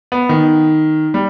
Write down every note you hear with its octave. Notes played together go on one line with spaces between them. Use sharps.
B3
D#3
G3